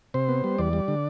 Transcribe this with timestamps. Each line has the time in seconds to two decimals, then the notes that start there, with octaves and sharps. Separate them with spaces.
0.14 C3 C5
0.29 B3
0.44 G3
0.58 E2 D5
0.73 G3
0.88 D3